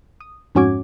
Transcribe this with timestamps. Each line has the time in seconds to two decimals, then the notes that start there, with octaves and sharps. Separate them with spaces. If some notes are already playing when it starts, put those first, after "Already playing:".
0.21 D#6
0.55 F2 G#2 C#4 F#4 D6 G#6